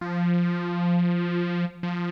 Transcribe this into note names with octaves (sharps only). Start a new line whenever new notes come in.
F3
F3